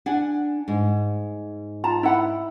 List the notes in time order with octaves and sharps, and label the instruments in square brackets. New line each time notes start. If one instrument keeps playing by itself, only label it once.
[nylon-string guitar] D4 F#5 G#5
G#2
[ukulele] F4 A5 A#5
E4 F#5 B5